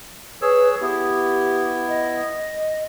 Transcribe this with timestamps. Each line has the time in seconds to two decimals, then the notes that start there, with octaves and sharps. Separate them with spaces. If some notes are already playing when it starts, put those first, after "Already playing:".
0.42 G#4 B4 C#5 E6
0.81 B3 E4 G4
1.89 D#5